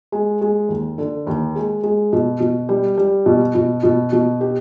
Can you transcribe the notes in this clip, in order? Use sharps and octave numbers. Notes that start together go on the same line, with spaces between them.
G#3
G#3
D#2
D3
D#2
G#3
G#3
B2
B2
G3
G3
B2
B2
B2
B2
G4